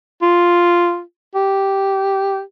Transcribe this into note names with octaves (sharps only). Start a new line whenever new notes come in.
F4
G4